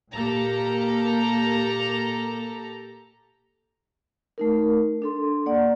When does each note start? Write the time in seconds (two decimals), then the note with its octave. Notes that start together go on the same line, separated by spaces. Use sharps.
0.13 A#2 A#3 G4 A4 A#5
4.38 A3 D#4 A#4
5.02 D4 A4 C6
5.46 A#3 D5 F#5